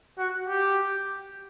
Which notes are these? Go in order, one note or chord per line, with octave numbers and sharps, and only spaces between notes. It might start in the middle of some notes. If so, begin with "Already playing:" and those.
F#4
G4